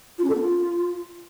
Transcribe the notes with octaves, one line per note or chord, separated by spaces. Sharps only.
F4
C#4
A4
B3
F4